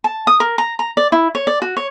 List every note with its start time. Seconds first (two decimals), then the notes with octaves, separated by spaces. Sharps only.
0.04 A5
0.27 D#6
0.40 A#4
0.58 A#5
0.79 A#5
0.97 D5
1.12 E4
1.35 C#5
1.47 D5
1.62 F#4
1.77 C#5